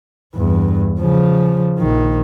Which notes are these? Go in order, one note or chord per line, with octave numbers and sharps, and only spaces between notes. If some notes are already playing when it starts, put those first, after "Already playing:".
E2 G2
C#3 F3
A#1 D#3